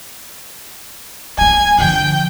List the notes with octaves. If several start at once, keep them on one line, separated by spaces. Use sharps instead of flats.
F#3 A#3 G#5
D3 F3 G5